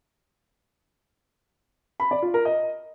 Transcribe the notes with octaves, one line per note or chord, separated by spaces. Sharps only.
B5
D5
F4
A#4
D#5